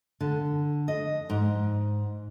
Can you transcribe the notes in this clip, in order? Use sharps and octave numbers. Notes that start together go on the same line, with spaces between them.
D3
D#5
G#2